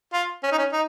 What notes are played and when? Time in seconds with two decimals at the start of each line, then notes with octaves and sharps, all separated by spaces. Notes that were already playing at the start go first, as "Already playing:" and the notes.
0.13 F4
0.43 C#4
0.52 D#4
0.58 C#4
0.72 D#4